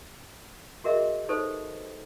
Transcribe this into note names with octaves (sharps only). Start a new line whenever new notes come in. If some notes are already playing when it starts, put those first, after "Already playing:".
F#4 G#4 A#4 D#5 E5
D#4 G4 A4 B4 C5